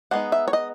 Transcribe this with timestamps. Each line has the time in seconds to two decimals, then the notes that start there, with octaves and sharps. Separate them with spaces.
0.11 G#3 B3 D#4 F#5
0.32 E5
0.48 C#5
0.53 D#5